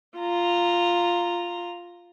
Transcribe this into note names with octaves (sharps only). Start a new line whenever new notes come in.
F4 A#5